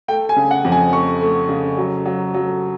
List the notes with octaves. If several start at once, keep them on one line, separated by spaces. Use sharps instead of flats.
A3 G5
G#5
C#3
F#5
F2
G#5
A3 C#6
A3
C#3
F#3
F#3
F#3